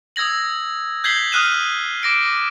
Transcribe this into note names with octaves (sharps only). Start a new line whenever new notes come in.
D#6 E6 G#6 A#6 F#7
G6 G#6 B6 C7 F#7 G7
D#6 F6 F#6 D#7 E7
D6 A#6 D7